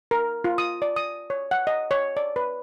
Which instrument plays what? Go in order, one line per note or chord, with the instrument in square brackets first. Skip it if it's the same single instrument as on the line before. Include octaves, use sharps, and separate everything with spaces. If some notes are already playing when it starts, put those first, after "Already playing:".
[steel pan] A#4
F4
D#6
D5
D#6
C#5
F#5
D#5
C#5
D5
B4